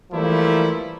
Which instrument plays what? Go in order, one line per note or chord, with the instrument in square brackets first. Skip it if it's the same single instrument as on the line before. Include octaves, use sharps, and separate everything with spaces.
[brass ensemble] E3 F3 G3 A3 A#3 E4